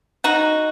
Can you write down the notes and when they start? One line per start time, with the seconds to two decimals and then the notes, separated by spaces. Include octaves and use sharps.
0.24 D#4 F#4